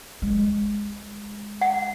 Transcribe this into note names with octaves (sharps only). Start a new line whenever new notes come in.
G#3
F#5